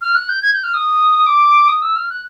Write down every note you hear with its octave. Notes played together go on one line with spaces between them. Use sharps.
F6
F#6
G6
G#6
G6
F6
D#6
D6
D#6
E6
F6
F#6